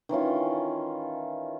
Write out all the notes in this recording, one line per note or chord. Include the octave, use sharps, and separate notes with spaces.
D#3 E3 C#4 F4